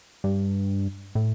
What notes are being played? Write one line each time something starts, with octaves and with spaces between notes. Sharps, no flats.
G2
A2